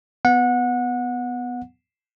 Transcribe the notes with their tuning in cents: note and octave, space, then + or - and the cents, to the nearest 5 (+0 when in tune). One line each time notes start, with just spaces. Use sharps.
B3 +10 F#5 -25